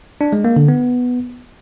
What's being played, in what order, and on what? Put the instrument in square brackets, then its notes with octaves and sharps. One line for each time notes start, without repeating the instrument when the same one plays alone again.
[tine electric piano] D4
G#3
A#3
D3
B3